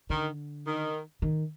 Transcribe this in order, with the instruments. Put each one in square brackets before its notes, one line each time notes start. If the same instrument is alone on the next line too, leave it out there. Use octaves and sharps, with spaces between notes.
[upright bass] D3 [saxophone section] D#3
[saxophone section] D#3
[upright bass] D#3